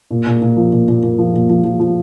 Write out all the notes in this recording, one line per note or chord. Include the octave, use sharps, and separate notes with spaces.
A#2
A#2
A#2
F3
A#2
A#2
A#2
F3
A#2
F3
F3
F3